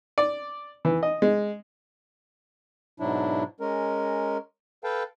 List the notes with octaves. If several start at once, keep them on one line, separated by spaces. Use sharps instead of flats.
D5
E3
D#5
G#3
G#2 B2 F#3 D4 E4
G#3 C#4 A#4
A4 B4 F5 G5 A5